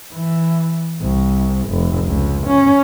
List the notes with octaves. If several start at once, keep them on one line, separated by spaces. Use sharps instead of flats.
E3
C2
F1
C#2
C#4